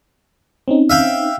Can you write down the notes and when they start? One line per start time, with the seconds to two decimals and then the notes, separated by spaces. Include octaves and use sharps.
0.68 C4 C#4 D#4
0.90 E5 F5 G5